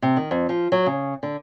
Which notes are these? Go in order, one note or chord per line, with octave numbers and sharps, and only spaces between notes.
C3
D#3
F2
F3
F#3
C#3
D3